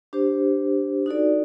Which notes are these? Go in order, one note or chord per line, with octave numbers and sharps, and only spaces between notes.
D4 G4 C5
D#4 F#4 A4 D5